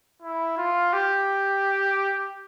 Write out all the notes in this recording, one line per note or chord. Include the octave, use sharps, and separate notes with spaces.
E4
F4
G4